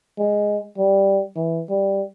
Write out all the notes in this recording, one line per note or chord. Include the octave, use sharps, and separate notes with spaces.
G#3
G3
E3
G3